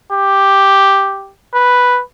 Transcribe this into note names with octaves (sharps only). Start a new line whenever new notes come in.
G4
B4